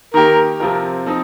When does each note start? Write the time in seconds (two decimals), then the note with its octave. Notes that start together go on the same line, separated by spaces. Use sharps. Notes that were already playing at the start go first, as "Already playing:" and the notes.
0.14 D#3 A#3 G4 A#4
0.60 C3 F3 C4 F4 A#4
1.06 F3 C4 D#4